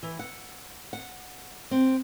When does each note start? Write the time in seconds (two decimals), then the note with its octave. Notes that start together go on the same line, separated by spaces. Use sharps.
0.03 E3
0.19 F#5
0.93 F#5
1.71 C4